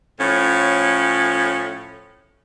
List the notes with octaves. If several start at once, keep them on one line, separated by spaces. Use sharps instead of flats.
A2 F3 C#4